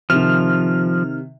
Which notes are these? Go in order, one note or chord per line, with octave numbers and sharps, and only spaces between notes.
C3 D#3 F3 F6